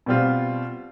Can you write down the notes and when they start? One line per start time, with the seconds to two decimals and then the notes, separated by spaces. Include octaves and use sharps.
0.06 B2 G3 C4 F4